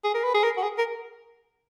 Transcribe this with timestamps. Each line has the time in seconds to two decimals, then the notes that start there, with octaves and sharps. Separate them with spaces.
0.04 G#4
0.14 A#4
0.23 B4
0.34 G#4
0.43 A#4
0.57 F#4
0.63 G#4
0.78 A#4